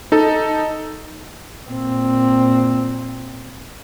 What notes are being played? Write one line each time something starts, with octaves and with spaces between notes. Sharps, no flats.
D#4 A4
A#2 C4